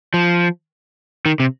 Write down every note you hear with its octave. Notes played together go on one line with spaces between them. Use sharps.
F3
D#3
C3